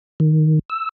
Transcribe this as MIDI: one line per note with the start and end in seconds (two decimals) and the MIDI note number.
0.20 0.59 51
0.70 0.89 88